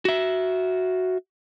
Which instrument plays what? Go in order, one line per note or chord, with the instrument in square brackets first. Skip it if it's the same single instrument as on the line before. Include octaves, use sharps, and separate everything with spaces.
[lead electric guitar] F#4 E5